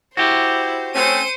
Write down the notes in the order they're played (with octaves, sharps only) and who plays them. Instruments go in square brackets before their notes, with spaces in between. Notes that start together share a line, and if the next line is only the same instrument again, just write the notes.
[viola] E4 [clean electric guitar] F#4 G4 [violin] C5
[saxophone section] A3 C4 C#4 [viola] C5 [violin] C#7 D#7